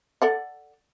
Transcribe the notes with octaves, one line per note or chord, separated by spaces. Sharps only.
A4 D5 F#5